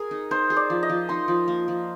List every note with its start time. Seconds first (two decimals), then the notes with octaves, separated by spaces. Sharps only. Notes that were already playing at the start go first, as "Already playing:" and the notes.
Already playing: G#4 A#4
0.11 D#4
0.31 D#4 C5
0.50 G#4
0.57 D5
0.70 F3
0.83 D#5
0.90 F3
1.09 D#4 C6
1.28 F3
1.48 A#3
1.68 F3